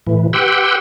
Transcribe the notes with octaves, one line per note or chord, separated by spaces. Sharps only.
A2 E3
G4 B4 F#5 G5 C6 E6